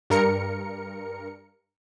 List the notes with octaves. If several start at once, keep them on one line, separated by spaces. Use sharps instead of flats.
G2 A#4 C#7